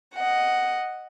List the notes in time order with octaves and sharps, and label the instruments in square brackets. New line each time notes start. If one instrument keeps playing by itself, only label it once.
[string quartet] D#5 F#5